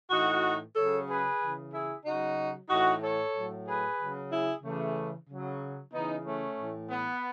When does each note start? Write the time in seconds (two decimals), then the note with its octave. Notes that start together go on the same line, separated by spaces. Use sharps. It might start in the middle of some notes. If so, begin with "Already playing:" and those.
0.10 A2 E3 D#4 F#4
0.75 C#3 F#3 A4 C#5
1.08 G#4 B4
1.40 C#3 E3
1.72 E4 G#4
2.05 C#3 F#3 D#4 F#4
2.69 A2 E3 D#4 F#4
3.02 A4 C#5
3.35 A2 F#3
3.67 G#4 B4
3.99 C#3 F#3
4.31 E4 G#4
4.63 C#3 E3 A3
5.28 C#3 F#3
5.93 C#3 E3 B3 D#4
6.25 A3 C#4
6.57 A2 E3
6.90 B3